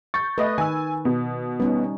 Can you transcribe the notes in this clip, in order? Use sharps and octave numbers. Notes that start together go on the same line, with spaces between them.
C#6 G6 A6
A3 B4 D#5
D#3 G#5 E6
B2
G3 B3 C#4 D#4